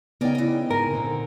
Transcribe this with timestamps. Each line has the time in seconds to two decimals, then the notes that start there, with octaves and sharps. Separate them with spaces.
0.21 C#3 B3 D#4 A#4 D5 G5 G#5
0.35 E3 D#5
0.70 G#2 A#4 G#5
0.91 A#2 D3 C4